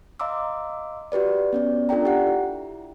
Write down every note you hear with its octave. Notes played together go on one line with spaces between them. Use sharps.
D#5 F5 A#5 C6 D6 E6
F#4 G4 B4 D5
B3 C#4 D5
D4 F4 A4 D5 G5 A#5
G4 F#5
E4